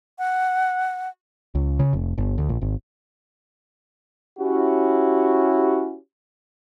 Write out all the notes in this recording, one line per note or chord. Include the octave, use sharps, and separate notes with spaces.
F#5
C#2
C#3
F1
G1
D2
A#1
G#1
C#4 E4 F#4 G4